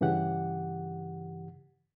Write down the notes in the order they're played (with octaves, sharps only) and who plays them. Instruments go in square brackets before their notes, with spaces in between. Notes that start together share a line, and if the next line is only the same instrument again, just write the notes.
[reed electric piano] G2 C#3 E3 G4 F#5